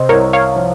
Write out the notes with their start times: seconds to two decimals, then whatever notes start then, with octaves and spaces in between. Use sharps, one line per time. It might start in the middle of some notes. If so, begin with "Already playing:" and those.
Already playing: C3 C5 D#5
0.09 C2 A#4 C#5
0.33 C#5 F5
0.56 F3